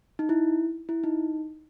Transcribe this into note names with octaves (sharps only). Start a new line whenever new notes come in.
D#4
E4
E4
D#4